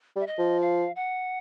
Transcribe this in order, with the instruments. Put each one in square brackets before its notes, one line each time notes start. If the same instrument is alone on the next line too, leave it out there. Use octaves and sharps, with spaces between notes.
[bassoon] G3
[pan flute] E5
D#5
[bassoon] F3
[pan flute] F5
F#5